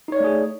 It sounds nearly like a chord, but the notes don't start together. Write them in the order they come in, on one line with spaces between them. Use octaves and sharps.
D#4 C#5 D5 A3 G#4